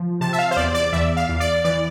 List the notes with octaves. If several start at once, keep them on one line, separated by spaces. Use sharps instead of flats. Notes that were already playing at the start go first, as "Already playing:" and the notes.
Already playing: F3
C3 A5
E5
F5
C5
E2 D5
D5
E2 E5
F5
E2
D5
E3 D5